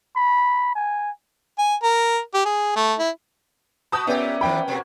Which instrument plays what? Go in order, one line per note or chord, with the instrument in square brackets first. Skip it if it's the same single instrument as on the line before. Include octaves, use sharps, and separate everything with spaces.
[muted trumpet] B5
G#5
[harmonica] G#5
A#4
G4
G#4
A3
E4
[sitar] F#4 B4 [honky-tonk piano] A5 D#6 G6
[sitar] A#2 G4 [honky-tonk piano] B3 C#4 [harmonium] D5 E5
[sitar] D#3 F3 A#3 [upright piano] G5 B5
[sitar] B2 A#3 [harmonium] F#4